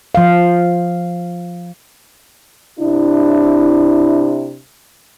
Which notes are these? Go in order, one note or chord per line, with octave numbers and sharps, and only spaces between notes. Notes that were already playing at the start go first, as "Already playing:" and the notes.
F3 F5
C3 D4 E4